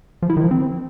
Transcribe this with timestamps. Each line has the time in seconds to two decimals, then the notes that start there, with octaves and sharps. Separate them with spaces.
0.22 F3
0.30 E4
0.37 D#3
0.44 F3
0.51 C4